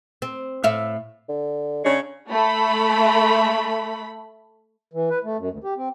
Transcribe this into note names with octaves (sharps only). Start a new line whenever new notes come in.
C4
A2 E5 F5
D3
C#3 G#3 D4 C#5
A3 B5
E3
B4
A3
F#2
D2
G4
C4